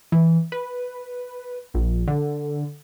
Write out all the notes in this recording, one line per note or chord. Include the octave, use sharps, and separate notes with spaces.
E3
B4
A#1
D3